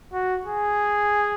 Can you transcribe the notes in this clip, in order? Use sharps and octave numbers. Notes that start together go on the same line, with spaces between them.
F#4
G#4